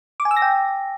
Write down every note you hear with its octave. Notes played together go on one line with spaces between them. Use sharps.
D6
G#5
E6
A#6
G5